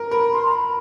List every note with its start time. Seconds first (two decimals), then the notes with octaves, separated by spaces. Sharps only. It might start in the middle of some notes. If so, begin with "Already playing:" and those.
Already playing: A#4
0.11 A#4 B5
0.32 C6
0.45 A#5
0.52 B5